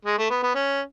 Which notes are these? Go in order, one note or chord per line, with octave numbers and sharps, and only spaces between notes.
G#3
A3
B3
B3
C#4